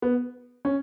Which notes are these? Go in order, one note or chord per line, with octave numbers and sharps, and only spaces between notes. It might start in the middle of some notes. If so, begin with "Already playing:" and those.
B3
C#4